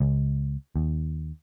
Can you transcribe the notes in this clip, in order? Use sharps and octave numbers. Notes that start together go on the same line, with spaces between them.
C#2
D#2